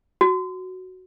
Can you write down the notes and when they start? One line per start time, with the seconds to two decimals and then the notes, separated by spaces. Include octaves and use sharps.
0.21 F#4